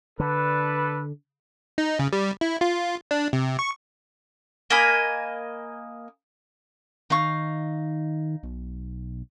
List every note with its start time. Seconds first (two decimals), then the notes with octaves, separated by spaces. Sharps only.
0.20 D3 D4 A4 B4
1.78 D#4
1.99 C#3
2.13 G3
2.41 E4
2.61 F4
3.11 D4
3.33 C3
3.59 C#6
4.70 A#3 D#5 G#5 B5
7.10 D#3 D#4 F5 C#6
8.43 B1